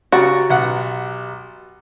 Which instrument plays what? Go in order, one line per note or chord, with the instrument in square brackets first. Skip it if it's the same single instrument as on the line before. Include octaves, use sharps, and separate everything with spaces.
[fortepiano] C#3 [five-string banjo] F#4 [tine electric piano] G4 A#5 A6
[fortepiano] B1 F#5